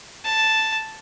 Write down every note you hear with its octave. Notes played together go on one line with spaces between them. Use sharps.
A5